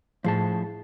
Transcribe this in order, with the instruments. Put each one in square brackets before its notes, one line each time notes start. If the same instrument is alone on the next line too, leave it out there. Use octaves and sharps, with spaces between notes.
[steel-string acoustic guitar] A2 [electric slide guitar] F3 G#4 A5